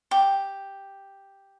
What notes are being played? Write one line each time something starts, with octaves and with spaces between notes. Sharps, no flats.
G4